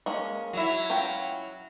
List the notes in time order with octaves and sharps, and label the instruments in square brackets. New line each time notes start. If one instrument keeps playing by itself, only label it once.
[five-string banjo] G#3 A#3 C#4
[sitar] F#3 E4
[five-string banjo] C#4 F4 G5